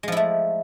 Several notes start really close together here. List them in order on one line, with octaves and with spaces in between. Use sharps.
G#3 F3 E4 A3